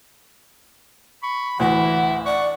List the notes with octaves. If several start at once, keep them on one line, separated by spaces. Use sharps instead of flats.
B5 C#6
D2 A2 E3 E4 F#5
D5 F#5 C#6